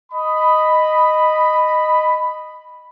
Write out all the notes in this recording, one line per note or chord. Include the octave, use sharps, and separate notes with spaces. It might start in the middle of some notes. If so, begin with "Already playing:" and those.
D#5 B5